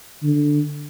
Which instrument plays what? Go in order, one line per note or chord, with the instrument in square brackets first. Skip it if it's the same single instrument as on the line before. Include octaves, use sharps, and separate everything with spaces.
[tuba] D3